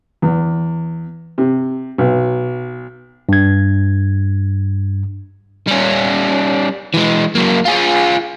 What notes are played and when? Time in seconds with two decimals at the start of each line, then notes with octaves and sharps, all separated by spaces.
0.22 E2
1.38 C3
1.98 B1
3.29 G2 G#6
5.68 G3 C#4
6.94 E3 G#3
7.35 F#3 A#3
7.65 F4 G#4